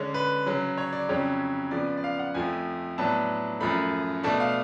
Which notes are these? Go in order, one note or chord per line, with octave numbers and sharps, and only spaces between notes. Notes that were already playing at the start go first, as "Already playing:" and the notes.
Already playing: D3 G#3 C#4
B4
C#3 F#3 C#4
C#5
D5
F2 C#3 F#3 C#4 C#5
C#3 F3 B3 D5
D5
F5
F#5
F2 F3 A3 G#5
A2 F#3 B3 D4 A5
F#2 F3 A3 B5
B2 A3 D4 A5
F5